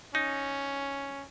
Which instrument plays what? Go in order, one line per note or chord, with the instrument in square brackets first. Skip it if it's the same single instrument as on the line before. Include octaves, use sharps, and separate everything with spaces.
[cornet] C#4 [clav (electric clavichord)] D#4